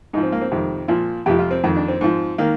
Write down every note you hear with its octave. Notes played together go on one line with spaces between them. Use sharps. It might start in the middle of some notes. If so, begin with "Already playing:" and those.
G#2 F3 D#4
C4
A#3
C4
F2 C3 D#3
A#2 F3
F2 C3 F3 G4
F4
C4
F2 D#3
D4
C4
G#2 F3
D#3 A#3